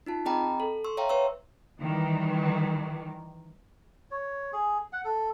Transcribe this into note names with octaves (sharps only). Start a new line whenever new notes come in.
D#4 F4 A5
C4 G#4 D#5 G5 A#5 B5
A4
C6 C#6 E6
C#5 E5 F5 G5 A#5 C6
B4 C#5 C#6 E6
D#3 E3 G3
C#5
G#4
F#5
A4